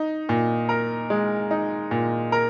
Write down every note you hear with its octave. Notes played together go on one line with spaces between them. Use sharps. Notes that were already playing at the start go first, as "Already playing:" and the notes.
Already playing: D#4
A#2
A#4
G#3
D#4
A#2
A#4